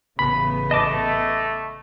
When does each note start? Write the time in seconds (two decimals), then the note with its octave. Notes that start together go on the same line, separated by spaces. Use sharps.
0.19 A1 C#3 B3 B5
0.71 A3 D#5 A5 D6